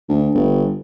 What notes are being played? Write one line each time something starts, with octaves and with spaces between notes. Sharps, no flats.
D2
G1